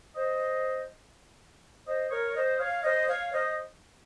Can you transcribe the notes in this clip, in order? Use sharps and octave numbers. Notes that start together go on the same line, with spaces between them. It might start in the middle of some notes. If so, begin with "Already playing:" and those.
C5 D#5
C5 D#5
A#4 C#5
C5 D#5
C#5 F5
C5 D#5
C#5 F5
C5 D#5